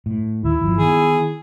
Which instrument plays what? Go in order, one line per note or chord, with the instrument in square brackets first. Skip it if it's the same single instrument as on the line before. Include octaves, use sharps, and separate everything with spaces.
[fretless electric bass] A2
[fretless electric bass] D#2 D#3 [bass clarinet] E4
[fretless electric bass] G1 F3
[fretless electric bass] D#3 B3 [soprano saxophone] G#4